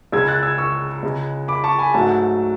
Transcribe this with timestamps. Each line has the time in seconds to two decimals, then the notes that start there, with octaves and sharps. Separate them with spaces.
0.12 C#2 C#3 G#3 E6 G#6
0.28 F#6 A6
0.43 E6 G#6
0.58 C#6 E6
1.03 C#2 C#3 G#3
1.48 B5 D6
1.64 A5 C#6
1.78 G#5 B5
1.94 G#2 F#3 A3 F#5 A5